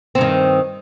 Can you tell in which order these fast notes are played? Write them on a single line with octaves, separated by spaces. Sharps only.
C4 G2 D#3